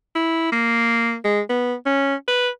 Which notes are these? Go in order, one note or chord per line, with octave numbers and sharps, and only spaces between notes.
E4
A#3
G#3
B3
C#4
B4